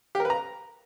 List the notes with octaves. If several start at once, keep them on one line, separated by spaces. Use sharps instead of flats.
G4
A#4
B4
A#5